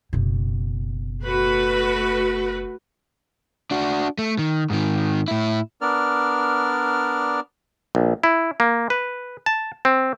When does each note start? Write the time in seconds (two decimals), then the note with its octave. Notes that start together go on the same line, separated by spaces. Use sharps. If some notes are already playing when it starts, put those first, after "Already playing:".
0.13 F#1 B2
1.23 A3 F#4 B4
3.71 D4 F#4
4.18 A3
4.39 D#3
4.70 G#2 D#3
5.28 A2 E4
5.81 B3 D4 A#4 D5 F6
7.95 A#1
8.23 E4
8.60 A#3
8.90 B4
9.46 A5
9.85 C4